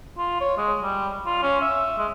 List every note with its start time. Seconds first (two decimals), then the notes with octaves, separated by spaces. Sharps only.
0.18 F4
0.41 C#5
0.58 G#3
0.82 G3
1.26 F4
1.42 C#4
1.61 E5
1.98 G#3